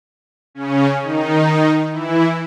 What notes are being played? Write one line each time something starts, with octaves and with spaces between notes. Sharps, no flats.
C#3 C#4
D#3 D#4
E3 E4